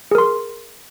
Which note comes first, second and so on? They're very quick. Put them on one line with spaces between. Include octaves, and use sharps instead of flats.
G#4 A#4 C6